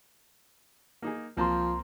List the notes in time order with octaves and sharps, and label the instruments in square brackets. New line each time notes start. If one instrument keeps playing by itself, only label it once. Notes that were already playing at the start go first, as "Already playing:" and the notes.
[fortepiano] A#3 D#4 G#4
[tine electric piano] C2 A#5 C6 [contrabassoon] F3 [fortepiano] A#3 C4 A5